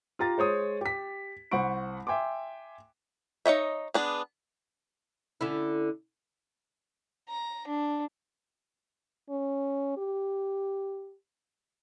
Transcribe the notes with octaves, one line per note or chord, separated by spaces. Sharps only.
F4 G4 A#5 A6
G#3 C5 C#5 D#6
G4 B6
C2 C5 F#5 B5 C#6 D7
E5 G5 G#5 C6 D6
D#4 C#5 D#5 E5
B3 D4 G#4
D3 C#4 E4
A#5
D4
C#4
G4